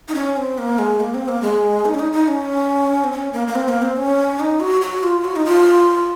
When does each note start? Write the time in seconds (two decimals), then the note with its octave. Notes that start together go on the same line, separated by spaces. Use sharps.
0.09 D#4
0.15 C#4
0.37 C4
0.58 A#3
0.79 G#3
1.00 A#3
1.14 C4
1.28 A#3
1.42 G#3
1.85 D#4
1.94 C#4
1.99 D#4
2.13 D#4
2.28 C#4
3.04 C4
3.12 C#4
3.33 A#3
3.48 A#3
3.55 C4
3.69 A#3
3.82 C4
3.97 C#4
4.40 D#4
4.60 F#4
4.82 F#4
5.03 F4
5.25 F#4
5.36 D#4
5.46 F4